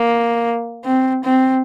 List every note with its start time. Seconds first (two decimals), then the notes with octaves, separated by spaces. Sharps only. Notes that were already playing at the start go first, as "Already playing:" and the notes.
Already playing: A#3
0.85 C4
1.24 C4